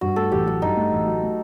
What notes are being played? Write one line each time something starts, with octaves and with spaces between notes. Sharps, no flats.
G2 F#4
A3 A4
A1 G4
F#3 F#4
G2 D#4
A3
A1
F#3
A3